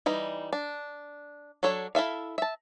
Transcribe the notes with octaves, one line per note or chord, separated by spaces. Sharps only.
E3 G3 D#4
D4
F#3 D4 A4 C#5
E4 A4 E5 F5
E5 A5